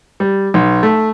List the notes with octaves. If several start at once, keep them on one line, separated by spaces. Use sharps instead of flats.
G3
B1
A3